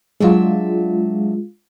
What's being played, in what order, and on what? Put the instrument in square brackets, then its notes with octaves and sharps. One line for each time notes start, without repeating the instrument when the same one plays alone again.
[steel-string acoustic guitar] F#3 D4 E5 [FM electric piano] G#3 F4